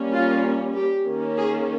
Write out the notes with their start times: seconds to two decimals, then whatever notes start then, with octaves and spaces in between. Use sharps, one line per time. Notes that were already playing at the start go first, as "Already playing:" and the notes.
Already playing: G3 A#3 C#4
0.14 F4
0.75 G4
1.06 D#3 A#3 C#4
1.37 G#4